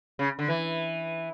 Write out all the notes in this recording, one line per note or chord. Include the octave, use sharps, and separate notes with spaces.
C#3
D3
E3